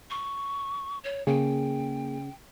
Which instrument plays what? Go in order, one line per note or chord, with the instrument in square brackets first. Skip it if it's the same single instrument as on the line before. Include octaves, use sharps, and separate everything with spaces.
[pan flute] C#6
C#5
[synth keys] C#3 [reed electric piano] A#3 G#4 [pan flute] G5